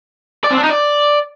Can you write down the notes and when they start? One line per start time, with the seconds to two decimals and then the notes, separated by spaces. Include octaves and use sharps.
0.44 D5
0.51 C4
0.57 D4
0.63 D#4
0.70 D5